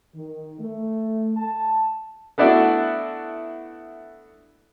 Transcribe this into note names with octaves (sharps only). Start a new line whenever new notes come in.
D#3
A3
A5
A3 B3 D4 E4 F#4 A4